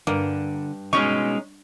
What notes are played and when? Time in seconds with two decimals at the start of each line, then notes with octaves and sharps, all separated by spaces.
0.07 G2 D3 A#3
0.93 B2 G#3 C#4 D#4 C#6